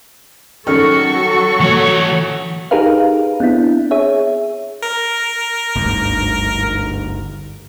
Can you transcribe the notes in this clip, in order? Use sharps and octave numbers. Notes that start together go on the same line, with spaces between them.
D#3 F#3 C#4 F#4 A4 C#6 F6
A#2 E3 C#5
D#4 G4 G#4 A#4 B4 F5
B3 C4 D4 E4
G#4 C#5 E5
A#4
G1 D2 G#2